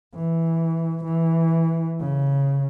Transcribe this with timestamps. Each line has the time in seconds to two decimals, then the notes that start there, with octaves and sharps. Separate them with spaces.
0.15 E3
1.04 E3
2.00 C#3